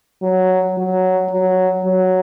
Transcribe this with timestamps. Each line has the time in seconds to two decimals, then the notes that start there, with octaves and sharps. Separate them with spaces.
0.23 F#3
0.78 F#3
1.31 F#3
1.85 F#3